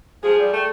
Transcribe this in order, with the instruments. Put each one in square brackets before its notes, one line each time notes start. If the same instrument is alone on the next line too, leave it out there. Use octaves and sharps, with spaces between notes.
[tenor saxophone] F3 [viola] G#4
[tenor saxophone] G3
A3